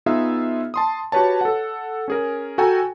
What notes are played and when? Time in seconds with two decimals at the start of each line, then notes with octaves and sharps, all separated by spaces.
0.06 B3 D#4 F4 G#4 E5 F5
0.74 A5 C6 D#6
1.12 F#4 G4 B4 C#5 A5
1.41 A4 F#5
2.08 C#4 G#4 A#4
2.58 F#4 A4 G5 G#5 A#5